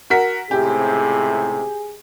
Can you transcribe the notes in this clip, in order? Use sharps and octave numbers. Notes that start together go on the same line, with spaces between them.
F#4 A#4 B6
C#2 A2 C3 G4 G#4